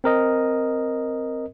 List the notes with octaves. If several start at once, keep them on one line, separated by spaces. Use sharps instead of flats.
C4 A#4 D#5